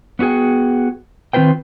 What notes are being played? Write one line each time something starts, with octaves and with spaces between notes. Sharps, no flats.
B3 C#4 F#4 G#4 G5
D#3 C4 F4 B4 C5 G5